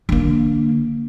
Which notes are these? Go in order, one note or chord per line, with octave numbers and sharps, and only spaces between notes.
D3 A#3